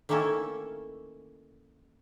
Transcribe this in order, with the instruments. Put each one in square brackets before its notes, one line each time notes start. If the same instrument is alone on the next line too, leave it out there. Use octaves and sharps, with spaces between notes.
[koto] D#3 A3 A#3 C#4 E4 A4